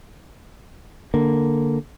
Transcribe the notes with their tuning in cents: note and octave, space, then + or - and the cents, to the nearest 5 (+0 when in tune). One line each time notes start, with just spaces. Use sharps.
D3 +0 A#3 +0